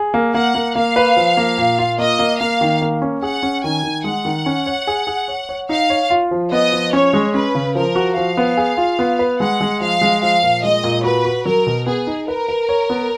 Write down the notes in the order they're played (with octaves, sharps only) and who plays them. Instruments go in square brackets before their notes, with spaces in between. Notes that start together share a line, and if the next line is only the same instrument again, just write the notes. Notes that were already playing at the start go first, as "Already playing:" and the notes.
Already playing: [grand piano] G#4
A#3
[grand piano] A#3 [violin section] F#5
[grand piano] A#3
[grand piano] A#3 [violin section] F5
[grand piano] B4
F3
A#3
A#2
F4
[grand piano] A#3 [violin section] D#5
[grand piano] A#3
[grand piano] A#3 [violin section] F5
[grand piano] D#3
A#3
C#4
[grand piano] G#4 [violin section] F#5
[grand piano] C#4
[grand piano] D#3 [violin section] G#5
[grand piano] D#3
[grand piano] G#3 [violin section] F#5
[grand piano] D#3
C#4
C#5
G#4
G#4
C#5
C#5
[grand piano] D#4 [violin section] F5
[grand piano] C#5
F4
F3
[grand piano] B3 [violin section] D#5
[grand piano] F3
[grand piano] C#4 [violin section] C#5
[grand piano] G#3
[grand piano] C#4 [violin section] B4
[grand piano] C#3
[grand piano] F3 [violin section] A#4
[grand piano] F#4
[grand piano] F3 [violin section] F5
[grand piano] B3
G#4
F4
B3
B4
[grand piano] G#3 [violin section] F#5
[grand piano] G#3
[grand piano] F3 [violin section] F5
[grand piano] G#3
[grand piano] F3 [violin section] F5
[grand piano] A#2
[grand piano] G#3 [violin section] D#5
[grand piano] A#2
[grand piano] F#4 [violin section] B4
[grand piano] F#4
[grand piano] F#3 [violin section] A#4
[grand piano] B2
[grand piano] B3 [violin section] G#4
[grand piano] D#4
[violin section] A#4 [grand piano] B4
[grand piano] B4
C#5
B3